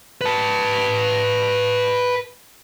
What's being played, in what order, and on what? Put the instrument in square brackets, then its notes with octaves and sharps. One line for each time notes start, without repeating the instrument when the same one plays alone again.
[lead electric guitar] B4 A5